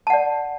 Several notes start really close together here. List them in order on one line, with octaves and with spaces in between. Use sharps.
A5 F#5 D5